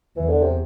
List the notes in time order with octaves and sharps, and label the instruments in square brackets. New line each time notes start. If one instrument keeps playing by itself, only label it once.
[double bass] E2 [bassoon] E3
[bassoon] D3
C3